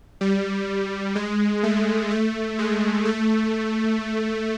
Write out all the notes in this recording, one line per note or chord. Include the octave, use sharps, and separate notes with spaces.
G3
G#3
A3
A3
G#3
A3